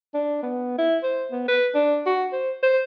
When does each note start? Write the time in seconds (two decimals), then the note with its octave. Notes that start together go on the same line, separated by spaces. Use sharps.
0.14 D4
0.43 B3
0.78 E4
1.03 C5
1.32 B3
1.48 B4
1.74 D4
2.06 F#4
2.33 C5
2.63 C5